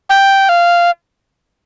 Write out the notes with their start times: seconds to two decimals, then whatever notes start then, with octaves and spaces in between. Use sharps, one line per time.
0.09 G5
0.49 F5